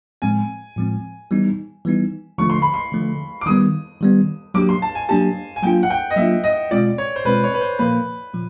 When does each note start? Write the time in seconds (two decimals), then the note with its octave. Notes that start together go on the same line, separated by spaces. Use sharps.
0.22 A2 F3 G#3 C4 G#5
0.76 A2 F3 G#3 C4
1.31 E3 G3 B3 D#4
1.85 E3 G3 B3 D#4
2.38 D3 F3 A3 C#6
2.50 C6
2.62 B5
2.74 C6
2.92 D3 F3 A3
3.41 D6
3.46 D#3 G3 B3 D#6
4.01 D#3 G3 B3
4.54 F#3 A#3 D4 G4 D6
4.69 C6
4.82 A5
4.95 G#5
5.09 F#3 A#3 D4 G4 A5
5.56 G#5
5.63 F#3 A#3 D4 F4 G5
5.83 F#5
5.91 G5
6.11 D#5
6.16 F#3 A#3 D4 F4 E5
6.44 D#5
6.71 B2 G#3 C4 F4 D5
6.98 C#5
7.16 C5
7.25 B2 G#3 C4 F4 B4
7.44 C#5
7.54 B4
7.61 C5
7.79 A#2 F3 A#3 B4
8.33 A#2 F3